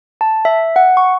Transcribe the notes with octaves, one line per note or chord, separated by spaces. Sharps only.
A5
E5
F#5
C#6